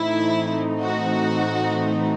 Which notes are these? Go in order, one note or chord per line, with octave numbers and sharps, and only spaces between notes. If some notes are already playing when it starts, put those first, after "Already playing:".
Already playing: A2 E3 A3 C4 D#4 E4
F#4